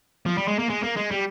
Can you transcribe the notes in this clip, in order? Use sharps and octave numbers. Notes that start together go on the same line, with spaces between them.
F3
G3
G#3
A#3
G#3
A#3
G#3
G3